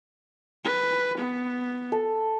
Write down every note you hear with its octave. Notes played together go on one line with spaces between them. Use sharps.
B4
B3
A4